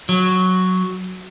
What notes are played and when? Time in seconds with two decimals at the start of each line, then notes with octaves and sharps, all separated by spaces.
0.09 F#3